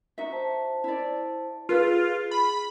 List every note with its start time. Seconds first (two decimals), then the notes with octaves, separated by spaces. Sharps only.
0.18 D#4 F#4 E5
0.32 C5 A5
0.84 E4 D5
1.69 F4 G#4 A4 B4 F5
2.31 B5